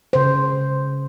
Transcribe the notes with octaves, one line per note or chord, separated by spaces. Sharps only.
C#3 C5